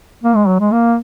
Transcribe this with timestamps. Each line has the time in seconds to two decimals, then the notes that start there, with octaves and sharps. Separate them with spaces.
0.24 A#3
0.36 G#3
0.47 F#3
0.60 G#3
0.72 A#3